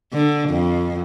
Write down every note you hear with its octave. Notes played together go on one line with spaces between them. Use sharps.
D3
F2